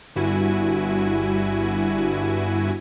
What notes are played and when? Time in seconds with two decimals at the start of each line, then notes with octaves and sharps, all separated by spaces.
0.16 G1 G2 E4 F#4 G#5